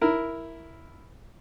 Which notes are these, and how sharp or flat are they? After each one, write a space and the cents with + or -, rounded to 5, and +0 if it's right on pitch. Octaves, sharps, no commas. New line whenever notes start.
E4 +0 A#4 +0